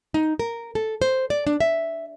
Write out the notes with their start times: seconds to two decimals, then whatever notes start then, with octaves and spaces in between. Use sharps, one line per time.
0.14 D#4
0.39 A#4
0.75 A4
1.02 C5
1.30 D5
1.47 D4
1.60 E5